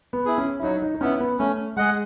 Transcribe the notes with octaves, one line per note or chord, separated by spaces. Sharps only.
B3
E4 G#4
C#4
E4
F#3 D#4
D#4
D#4
B3 C#4 E4
B3
A3 C#4
G#3 G#4 D#5 F#5